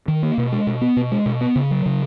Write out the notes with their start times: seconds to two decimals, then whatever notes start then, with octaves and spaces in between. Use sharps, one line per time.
0.08 D#3
0.23 A#3
0.38 B2
0.52 G#3
0.67 B2
0.81 B3
0.97 B2
1.12 G#3
1.26 B2
1.41 B3
1.56 C#3
1.71 F#3
1.86 C#3